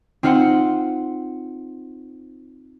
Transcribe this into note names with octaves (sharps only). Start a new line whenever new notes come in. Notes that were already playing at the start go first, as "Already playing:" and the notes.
C4 D#4 F4 C5 F#5